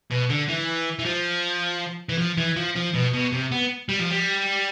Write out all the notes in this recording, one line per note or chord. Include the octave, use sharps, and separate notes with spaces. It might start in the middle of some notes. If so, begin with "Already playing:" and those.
B2
D3
E3
E3
F3
E3
F3
E3
F3
F3
B2
B2
C3
B3
G3
F3
G3